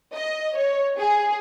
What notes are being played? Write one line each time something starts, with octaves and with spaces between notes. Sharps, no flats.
D#5
C#5
G#4